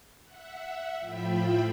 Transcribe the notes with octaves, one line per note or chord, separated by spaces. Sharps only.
E5 F#5
A2 F3 F4 E5 G5 B5